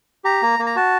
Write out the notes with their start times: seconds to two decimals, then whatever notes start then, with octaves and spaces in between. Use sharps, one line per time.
0.24 G4 A#5
0.42 A#3
0.59 A#3
0.66 A#5
0.76 F#4 A5